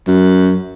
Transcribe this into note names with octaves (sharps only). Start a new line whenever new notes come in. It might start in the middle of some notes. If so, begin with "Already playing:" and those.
F#2